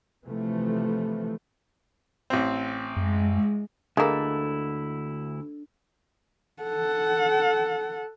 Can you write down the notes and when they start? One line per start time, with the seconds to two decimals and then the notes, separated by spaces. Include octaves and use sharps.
0.24 C3 E3 F3 A3
2.30 A1 C4
2.96 F#2 G#3
3.97 D2 G#3 A#3 D4 E4 A4
6.63 A4 F#5